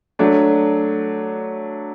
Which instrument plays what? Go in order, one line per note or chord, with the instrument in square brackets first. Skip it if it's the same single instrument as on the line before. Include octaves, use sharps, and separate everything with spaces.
[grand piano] F#3 A3 D4